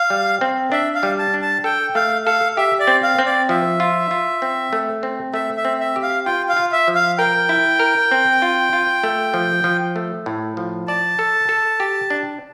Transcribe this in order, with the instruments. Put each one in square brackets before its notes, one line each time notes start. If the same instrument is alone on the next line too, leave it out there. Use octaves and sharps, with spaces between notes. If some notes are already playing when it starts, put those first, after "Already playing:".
Already playing: [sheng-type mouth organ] F5
[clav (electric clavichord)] G3
C4
[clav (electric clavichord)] D4 [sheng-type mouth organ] E5
[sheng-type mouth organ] F5
[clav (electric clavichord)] G3
[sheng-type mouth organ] A5
[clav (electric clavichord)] D4
[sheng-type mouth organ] A5
[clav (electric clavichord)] A4 [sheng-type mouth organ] G5
[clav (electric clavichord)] A3 [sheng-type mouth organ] F5
[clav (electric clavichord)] A4 [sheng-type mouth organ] F5
[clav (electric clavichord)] G4 [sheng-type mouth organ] E5
[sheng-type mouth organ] D5
[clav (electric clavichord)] C4
[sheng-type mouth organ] F5
[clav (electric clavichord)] C4
[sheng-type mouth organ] D5
[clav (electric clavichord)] F3 [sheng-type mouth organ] E5
[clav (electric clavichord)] F4
F4
C4
A3
C4
[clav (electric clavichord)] A3 [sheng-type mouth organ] E5
[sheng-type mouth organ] E5
[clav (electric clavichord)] C4
[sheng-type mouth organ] E5
[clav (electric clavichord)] G4
[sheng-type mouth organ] F5
[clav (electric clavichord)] F4 [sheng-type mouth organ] G5
[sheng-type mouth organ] F5
[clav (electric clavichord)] F4
[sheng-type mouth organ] E5
[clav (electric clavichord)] F3
[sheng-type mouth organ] F5
[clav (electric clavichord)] A#4 [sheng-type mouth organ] G5
[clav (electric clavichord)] E4
A#4
C4
F4
F4
A3
F3
F3
A3
A2
F3
[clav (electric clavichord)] D5 [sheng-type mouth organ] A5
[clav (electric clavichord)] A4
A4
G4
D4